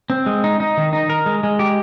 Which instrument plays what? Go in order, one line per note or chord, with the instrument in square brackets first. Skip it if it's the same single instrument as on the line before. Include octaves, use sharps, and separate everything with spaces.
[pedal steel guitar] C4
G#3
D#4
D#4
D#3
D#4
A#4
G#3
G#3
G4